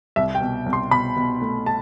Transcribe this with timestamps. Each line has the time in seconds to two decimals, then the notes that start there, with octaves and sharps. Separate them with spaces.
0.16 C2 E5
0.35 G5
0.41 B2
0.66 C2
0.73 C6
0.91 B2 B5
1.16 B2
1.41 A3
1.66 A5